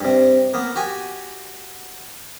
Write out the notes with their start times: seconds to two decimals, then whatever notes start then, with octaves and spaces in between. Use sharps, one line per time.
0.01 G2 C3
0.54 A#3 B3
0.76 F#4 G4 G#5